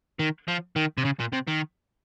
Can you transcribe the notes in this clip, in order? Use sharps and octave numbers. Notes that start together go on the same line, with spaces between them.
D#3
F3
D#3
C3
C#3
A#2
C3
D#3